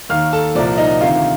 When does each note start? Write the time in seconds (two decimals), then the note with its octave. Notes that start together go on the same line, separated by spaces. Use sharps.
0.09 D#2 D#3 F5 F6
0.33 A4 A5
0.55 C2 A#2 F3 D5
0.78 D#4 D#5
1.01 D2 C3 D#3 F4 F5